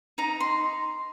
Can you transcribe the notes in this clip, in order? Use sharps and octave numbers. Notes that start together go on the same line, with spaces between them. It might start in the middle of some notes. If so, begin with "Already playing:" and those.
D#4 A#5
C6